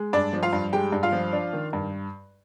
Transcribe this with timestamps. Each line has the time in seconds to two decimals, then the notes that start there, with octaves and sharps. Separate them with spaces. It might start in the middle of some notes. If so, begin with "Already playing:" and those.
Already playing: G#3
0.13 G2 D4 D5
0.33 F3
0.43 F4 F5
0.53 G2
0.73 G#3 G4 G5
0.92 G2
1.03 F4 F5
1.12 F3
1.33 D4
1.53 D#3
1.73 G2